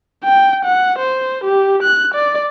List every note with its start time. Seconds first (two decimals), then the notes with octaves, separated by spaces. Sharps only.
0.24 G5
0.65 F#5
0.98 C5
1.44 G4
1.83 F#6
2.14 D5